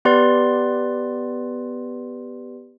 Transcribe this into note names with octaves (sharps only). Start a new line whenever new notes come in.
B3 G4 B4 D5 C6 A6